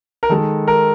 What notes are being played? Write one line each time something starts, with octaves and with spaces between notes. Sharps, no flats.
A#4
D#3 G#3 A4
A#4